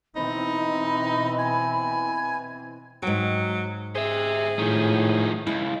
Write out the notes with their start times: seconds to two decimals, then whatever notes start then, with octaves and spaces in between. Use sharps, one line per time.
0.16 B2 E3 C4 D#4 B5
1.39 G#5
3.02 G#2 F#3 G5
3.95 G#4 C5 E5
4.59 A2 D#3 F3
5.47 C#2 E4